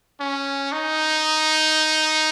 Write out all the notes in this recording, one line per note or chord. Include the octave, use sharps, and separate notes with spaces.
C#4
D#4